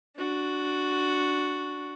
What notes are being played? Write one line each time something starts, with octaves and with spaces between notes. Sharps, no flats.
D4 F#4